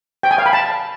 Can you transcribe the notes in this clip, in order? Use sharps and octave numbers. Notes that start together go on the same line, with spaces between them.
G5
G#5
F5
B5
A5